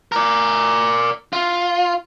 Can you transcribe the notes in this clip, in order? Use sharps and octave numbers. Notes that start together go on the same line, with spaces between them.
A#4 D5
F4